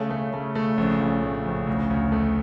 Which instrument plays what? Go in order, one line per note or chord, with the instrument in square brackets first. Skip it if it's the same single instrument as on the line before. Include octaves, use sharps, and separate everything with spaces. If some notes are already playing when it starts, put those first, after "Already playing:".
Already playing: [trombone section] C#3 [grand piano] A3
[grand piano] A3
[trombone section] C#3 [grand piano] A3
[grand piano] A3
[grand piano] A#1 [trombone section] C#3
[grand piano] A#1
[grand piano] A2 [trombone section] C#3
[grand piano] A#1
D2
D2
A3